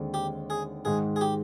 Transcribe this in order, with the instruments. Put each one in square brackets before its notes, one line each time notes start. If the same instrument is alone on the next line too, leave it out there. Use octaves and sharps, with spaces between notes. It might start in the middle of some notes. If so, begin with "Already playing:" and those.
Already playing: [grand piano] D#2 D3 G#3 C4
[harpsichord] G4
G#4
[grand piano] G#2 D#3 G#3 [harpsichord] G#4
[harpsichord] G#4
G4